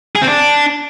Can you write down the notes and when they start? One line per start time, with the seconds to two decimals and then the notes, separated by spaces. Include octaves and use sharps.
0.16 G#4
0.21 C4
0.27 D4